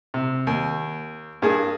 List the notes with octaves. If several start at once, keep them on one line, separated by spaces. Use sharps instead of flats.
C3
D#2
G2 A#3 G#4